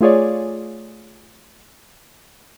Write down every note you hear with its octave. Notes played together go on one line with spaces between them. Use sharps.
A3 F4 G#4 C#5 D5